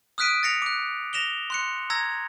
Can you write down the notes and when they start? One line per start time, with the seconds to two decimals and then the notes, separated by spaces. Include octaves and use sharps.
0.18 D#6 F6 F#6 B6 D7 D#7
0.43 A6 A#6 C#7 F7
0.62 D6 F#6
1.13 A#6 E7 F7 G7
1.50 C6 F#6 C#7
1.90 A#5 E6 G#6 A#6